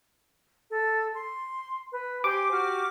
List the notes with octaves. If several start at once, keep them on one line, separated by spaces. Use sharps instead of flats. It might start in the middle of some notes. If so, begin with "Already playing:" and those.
A4
C6
B4
G4 C5 G#5 D6
F#4 G4 F6